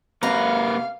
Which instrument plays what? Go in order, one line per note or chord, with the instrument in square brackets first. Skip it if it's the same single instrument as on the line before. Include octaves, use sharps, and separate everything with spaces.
[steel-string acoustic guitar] F#2 C3 A#5 [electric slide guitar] A#3 B4 [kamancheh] F5